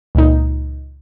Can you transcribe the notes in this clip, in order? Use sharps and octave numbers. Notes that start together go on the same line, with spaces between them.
C#2 A#2 D#4